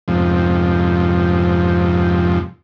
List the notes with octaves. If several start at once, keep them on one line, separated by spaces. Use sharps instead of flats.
F2 G#2 C3 F3